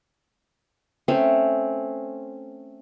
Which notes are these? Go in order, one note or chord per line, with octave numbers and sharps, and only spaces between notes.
A3 C4 C#4